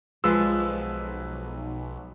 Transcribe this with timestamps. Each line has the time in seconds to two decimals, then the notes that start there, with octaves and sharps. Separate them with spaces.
0.24 B1 F3 G#3 B4 E6